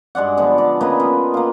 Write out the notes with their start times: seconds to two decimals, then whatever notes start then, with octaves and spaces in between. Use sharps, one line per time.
0.15 G2 G#3 D5 F#5
0.38 D3 F3 B3
0.58 D3 D5
0.81 C#3 A#3 B4 D#5
1.00 B3 F4
1.34 A#3 F4